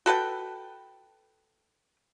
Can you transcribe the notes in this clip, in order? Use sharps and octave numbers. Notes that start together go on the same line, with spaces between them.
F#4 A4 B4 G5